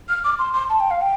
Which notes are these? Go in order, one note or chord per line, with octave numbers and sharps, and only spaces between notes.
F6
D6
C6
C6
A5
G5
F5
G5